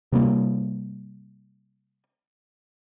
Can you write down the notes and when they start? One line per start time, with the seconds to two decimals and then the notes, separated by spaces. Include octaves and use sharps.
0.12 C3 G3 A#3